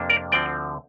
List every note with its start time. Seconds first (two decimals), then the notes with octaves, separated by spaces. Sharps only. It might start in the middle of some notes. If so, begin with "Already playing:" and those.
Already playing: F2 C3 A#3 D4
0.10 A#4 D5
0.32 D2 D3 F3 C4 D5 G5